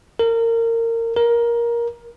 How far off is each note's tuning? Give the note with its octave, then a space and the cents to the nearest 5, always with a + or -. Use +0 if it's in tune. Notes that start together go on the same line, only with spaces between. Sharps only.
A#4 -25
A#4 +15